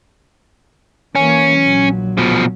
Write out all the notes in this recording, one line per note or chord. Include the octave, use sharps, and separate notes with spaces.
E3 A#3 C#4
A#1 F#3
B2 F3